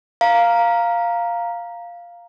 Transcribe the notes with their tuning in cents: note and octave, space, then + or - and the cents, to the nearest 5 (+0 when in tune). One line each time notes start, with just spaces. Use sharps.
F5 +0 A#5 +0